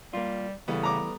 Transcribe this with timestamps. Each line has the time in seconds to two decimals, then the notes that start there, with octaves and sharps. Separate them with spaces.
0.14 G3 A#3 F4
0.68 C#3 E3 G3 A3 B3
0.83 A#5 D6